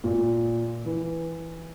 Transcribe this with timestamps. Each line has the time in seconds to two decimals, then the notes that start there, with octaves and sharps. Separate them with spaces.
0.04 A#2
0.86 E3